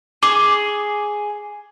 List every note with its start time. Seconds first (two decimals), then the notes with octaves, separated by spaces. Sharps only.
0.23 G#4 D6